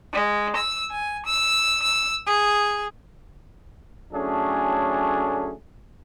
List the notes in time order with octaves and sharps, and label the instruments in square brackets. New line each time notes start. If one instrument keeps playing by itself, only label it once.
[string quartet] G#3
E6
G#5
E6
E6
G#4
[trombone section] A2 F#3 A3 C#4 D4 G#4